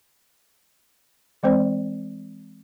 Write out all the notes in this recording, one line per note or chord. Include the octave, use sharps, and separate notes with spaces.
E3 G#3 C4 C5 D5